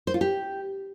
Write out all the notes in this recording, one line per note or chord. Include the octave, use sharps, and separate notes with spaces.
C5
F4
G4